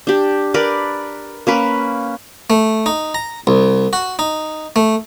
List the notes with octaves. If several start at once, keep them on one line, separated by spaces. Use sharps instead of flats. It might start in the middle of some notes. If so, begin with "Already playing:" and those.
D4 G4
A#4 B4 D5
A#3 C#4 B4
A3
D#4
A#5
C2
F#4
D#4
A3